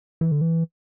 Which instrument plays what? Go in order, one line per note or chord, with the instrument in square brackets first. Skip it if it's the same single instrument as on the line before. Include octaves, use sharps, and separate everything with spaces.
[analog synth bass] E3
D3
E3